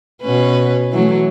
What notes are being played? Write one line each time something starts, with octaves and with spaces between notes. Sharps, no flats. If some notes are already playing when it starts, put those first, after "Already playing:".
B2 C#4 B4
E3 F#3 A3